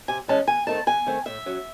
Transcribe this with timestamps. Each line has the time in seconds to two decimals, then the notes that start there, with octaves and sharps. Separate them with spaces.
0.08 C3 G#5
0.28 E3 G#3 C#4 A5
0.47 E2 G#5
0.67 D#3 A3 C4 A5
0.87 E2 G#5
1.06 D#3 A3 C4
1.26 A2 E5
1.46 F#3 C#4